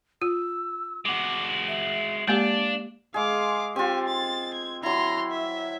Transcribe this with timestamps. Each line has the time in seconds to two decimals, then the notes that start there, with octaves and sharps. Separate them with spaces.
0.22 F4 E6
1.05 G#3 F#4 D6
1.68 E5
2.28 G#3 A#3 D4 G4 F5
3.14 G#3 G#4 F5 D6
3.76 C4 F4 G4 G#5
4.07 A6
4.53 G#6
4.83 F#3 E4 A#5 C6
5.31 E5